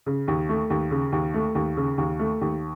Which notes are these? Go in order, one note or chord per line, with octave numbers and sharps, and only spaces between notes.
C#3
D#2
A3
D#2
C#3
D#2
A3
D#2
C#3
D#2
A3
D#2